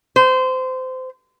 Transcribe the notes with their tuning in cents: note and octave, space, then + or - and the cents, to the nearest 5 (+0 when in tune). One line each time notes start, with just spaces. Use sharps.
C5 -25